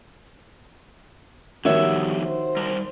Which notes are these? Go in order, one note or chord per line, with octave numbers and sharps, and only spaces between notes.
D3 D#3 F3 G3 B3 F#4 C#5 E5
C5
G3 A#4